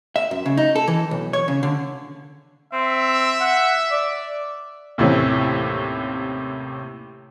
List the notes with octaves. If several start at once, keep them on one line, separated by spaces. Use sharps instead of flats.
E5
F#2
C#3
D#4
A4
E3
B1
C#5
C#3
D3
C4 E5
F#5
D5
D#2 A2 C3 E3 C#4